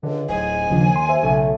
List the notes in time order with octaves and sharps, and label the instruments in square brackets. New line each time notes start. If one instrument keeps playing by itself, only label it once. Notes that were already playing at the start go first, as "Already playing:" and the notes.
[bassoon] C#2 [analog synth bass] D3
[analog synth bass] D1 [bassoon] G#2 [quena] G#5
[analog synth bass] D#2 [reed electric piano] C#3 F3 D4
[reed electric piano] C6
C5 E5
[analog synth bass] B1 [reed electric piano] C#3 [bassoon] A3